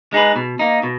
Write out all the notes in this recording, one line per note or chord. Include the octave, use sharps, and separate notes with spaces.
G#3 D#4 G#4 B4
B2
A#3 D#4
B2